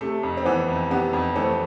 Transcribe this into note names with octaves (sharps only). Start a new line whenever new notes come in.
C3 A3
F2
C4
E3 B3
F2
C3 B3
F2
E3 A3 C4